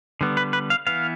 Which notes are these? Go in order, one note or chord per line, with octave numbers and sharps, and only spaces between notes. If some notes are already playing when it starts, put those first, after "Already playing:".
D3 G3 B3
B4
B4
F5
E3 B3 F5